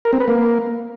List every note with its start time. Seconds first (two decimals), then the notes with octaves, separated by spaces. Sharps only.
0.05 A#4
0.13 C4
0.20 B4
0.28 A#3